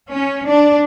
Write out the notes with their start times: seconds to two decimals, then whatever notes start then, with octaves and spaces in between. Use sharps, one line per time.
0.10 C#4
0.47 D4